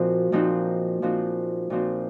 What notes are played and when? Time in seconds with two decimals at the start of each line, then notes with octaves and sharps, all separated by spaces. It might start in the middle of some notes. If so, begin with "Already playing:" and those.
Already playing: A#2 F3 C4 D#4 F#4
0.32 A#2 F3 C4 D#4 F#4
1.02 A#2 F3 C4 D#4 F#4
1.70 A#2 F3 C4 D#4 F#4